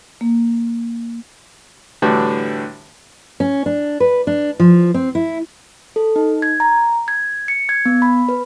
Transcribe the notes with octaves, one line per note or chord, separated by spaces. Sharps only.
A#3
A2 D3 E3 G3 D4 F#4
C#4
D4
B4
D4
F3
C4
E4
A4
D#4
G#6
A#5
G#6
C#7
G#6
B3
B5
B4